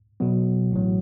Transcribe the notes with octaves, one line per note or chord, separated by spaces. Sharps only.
B2 F#3 B3
A1 A2 F#3